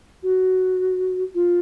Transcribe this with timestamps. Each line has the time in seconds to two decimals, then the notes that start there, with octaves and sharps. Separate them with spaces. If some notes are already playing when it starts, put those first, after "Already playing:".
0.23 F#4
1.35 F4